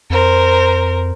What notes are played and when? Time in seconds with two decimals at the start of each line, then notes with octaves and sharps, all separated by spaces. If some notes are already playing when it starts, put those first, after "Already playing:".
0.10 F2 A#4 C5